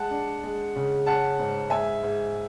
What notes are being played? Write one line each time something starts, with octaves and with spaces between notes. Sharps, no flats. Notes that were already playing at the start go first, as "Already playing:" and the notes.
Already playing: G#3 F#5 A5
D4
G#3
C#3
C#4 F#5 A5
G#2
G#3 E5 G#5
G#2